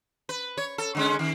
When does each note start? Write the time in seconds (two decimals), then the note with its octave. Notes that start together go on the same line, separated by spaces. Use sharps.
0.29 B4
0.57 C#5
0.78 A4
0.95 D3 G#3 C#4
1.19 D#3